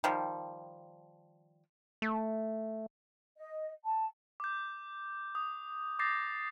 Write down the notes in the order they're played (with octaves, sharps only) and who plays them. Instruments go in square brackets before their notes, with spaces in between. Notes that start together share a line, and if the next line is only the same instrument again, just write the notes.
[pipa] D#3 F3 G3
[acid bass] A3
[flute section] D#5
A5
[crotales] D6 G6
D#6
D6 D#6 G6 A6 A#6 C7